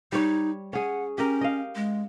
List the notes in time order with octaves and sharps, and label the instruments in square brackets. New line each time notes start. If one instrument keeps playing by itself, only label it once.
[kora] G3 C#5 [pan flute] D#4
[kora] C#4 G#4 [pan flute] F#5
[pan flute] C#4 [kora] G4 A#4
[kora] D#5 F5
[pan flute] G#3